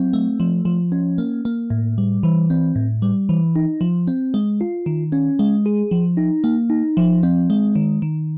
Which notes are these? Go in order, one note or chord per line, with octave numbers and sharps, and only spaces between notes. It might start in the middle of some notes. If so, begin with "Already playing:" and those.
Already playing: F#3 C4
A3
F3
F3
C#4
A#3
A#3
A2
G3
E3
C4
A2
G3
E3
D#4
F3
C4
G#3
F4
D#3
C#4
G#3
G#4
F3
D#4
A#3
D#4
F3
C4
G#3
D#3
D#3